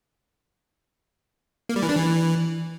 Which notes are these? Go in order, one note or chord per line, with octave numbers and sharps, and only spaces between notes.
A#3
G3
E3
D4
E3